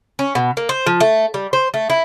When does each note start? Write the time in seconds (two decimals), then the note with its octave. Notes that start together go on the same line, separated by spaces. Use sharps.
0.19 C#4
0.35 B2
0.57 A#3
0.69 C5
0.86 F3
1.00 A3
1.34 G3
1.53 C5
1.74 A3
1.90 E4